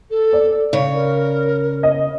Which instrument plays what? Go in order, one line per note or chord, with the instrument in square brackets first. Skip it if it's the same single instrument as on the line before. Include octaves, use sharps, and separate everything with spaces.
[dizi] A4
[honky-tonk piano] D5
[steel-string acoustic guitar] C#3 C#5
[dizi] A#4
[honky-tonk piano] D#5